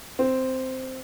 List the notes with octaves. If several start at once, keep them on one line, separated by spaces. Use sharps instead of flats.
C4